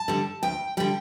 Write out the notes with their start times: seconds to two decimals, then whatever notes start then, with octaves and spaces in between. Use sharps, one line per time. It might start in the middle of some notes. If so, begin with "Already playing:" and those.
Already playing: A5
0.08 D3 G3
0.43 D2 G5
0.77 D3 G3 G5